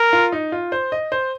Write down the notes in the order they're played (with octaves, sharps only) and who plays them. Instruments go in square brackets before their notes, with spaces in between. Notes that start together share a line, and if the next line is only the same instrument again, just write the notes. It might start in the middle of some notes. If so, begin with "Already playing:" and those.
Already playing: [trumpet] A#4
[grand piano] F4
D#4
F4
C5
D#5
C5